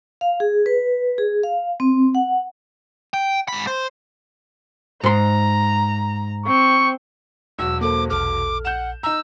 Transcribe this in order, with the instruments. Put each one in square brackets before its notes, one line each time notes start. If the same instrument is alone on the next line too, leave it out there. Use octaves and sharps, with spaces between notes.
[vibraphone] F5
G#4
B4
G#4
F5
C4
F#5
[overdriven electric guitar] G5
G#2 B5
C5
[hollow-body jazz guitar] G#2 C6 [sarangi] A#5
[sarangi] C4 [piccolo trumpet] C#6
[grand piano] E1 F#3 F#4 [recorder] E6
[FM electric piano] A#3 A4 C5 [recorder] D6
[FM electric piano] A#1 A4 F6 [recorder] D6
[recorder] F#5 [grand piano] G6 E7
[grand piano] D#4 A#5 [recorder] E6